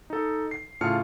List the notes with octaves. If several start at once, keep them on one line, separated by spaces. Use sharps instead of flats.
D#4 A4
C7
A2 C#3 F4 A5 F6 C#7